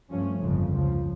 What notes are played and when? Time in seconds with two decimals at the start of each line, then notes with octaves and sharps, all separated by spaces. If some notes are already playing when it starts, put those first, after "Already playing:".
0.10 G2 F3 A3 C#4
0.42 G1 F2 C#3 F3
0.73 C#2 C#3 F3